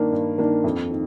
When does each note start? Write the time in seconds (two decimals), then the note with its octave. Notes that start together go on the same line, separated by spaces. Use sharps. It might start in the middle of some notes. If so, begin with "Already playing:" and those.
Already playing: G2 D#3 A#3 D4
0.12 G2
0.38 D#3 A#3 D4
0.64 F2
0.91 D#3